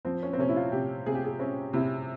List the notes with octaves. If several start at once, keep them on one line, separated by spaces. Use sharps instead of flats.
F3 C4
C#4
C4
C3 C#4
E4
F4
C3 G4
C3 G#4
G4
G#4
C4 C#4
C3 E4